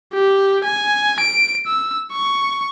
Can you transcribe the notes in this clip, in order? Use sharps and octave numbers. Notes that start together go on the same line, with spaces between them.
G4
G#5
D7
E6
C#6